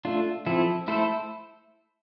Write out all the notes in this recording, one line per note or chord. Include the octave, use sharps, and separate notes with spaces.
A3 D4 F4
F3 C4 E4 A4
A3 E4 A4 C5